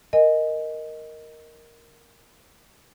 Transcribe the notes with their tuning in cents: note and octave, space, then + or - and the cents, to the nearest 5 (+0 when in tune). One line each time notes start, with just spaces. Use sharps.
A#4 +0 D#5 +0 G#5 +0